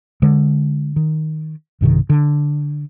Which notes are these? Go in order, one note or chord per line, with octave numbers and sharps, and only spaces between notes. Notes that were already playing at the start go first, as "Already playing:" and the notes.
D3 G#3
D#3
B1 G2 C3 D#3
D3